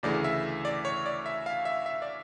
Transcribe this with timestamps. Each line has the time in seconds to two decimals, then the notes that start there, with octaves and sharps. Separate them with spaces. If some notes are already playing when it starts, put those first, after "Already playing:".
0.03 D2 C#3 E3 A3 D5
0.24 E5
0.65 D5
0.85 C#5
1.06 D5
1.26 E5
1.46 F5
1.65 E5
1.86 E5
2.02 D5